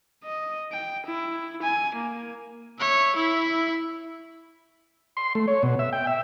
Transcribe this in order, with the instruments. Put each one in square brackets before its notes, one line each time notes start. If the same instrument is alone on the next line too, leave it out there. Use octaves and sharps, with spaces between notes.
[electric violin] D#5
G5
E4
G#5
A#3
C#5 E5
E4 E5
[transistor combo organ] C6
A3
C#5
B2
E5
G5
E5